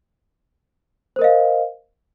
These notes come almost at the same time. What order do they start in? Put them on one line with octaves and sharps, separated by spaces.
C5 A#4 D#5 F5